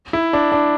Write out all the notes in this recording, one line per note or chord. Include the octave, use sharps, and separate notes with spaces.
E4
D4
D4